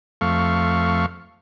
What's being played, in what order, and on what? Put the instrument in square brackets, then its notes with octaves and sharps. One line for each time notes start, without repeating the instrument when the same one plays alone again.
[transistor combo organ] F2 A3 F5 C#6